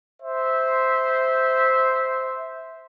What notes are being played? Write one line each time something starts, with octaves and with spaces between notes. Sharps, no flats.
C5 E5